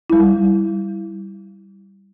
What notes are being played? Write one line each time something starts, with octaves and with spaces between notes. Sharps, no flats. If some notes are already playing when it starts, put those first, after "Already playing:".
G3 E4